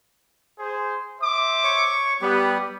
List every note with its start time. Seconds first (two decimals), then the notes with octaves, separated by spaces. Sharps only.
0.59 G#4 C5
1.20 C5 E5 D6
1.64 C#5 C#6
2.21 G3 B3 G4